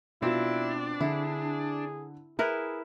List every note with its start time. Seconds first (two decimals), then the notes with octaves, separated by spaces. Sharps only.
0.22 B2 C4 D4 E4 F4
1.01 D3 E4 G#4
2.39 E4 G#4 A#4 B4